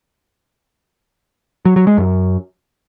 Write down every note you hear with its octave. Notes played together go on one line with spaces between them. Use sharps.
F#3
F#3
G#3
F#2